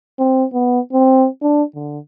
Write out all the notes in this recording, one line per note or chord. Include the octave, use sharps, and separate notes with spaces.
C4
B3
C4
D4
D3